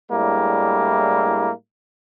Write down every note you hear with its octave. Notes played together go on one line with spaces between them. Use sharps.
A2 G3 G#3 A#3 D4 E4